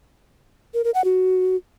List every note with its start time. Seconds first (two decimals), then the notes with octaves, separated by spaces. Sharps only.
0.74 A#4
0.84 A#4
0.94 F#5
1.05 F#4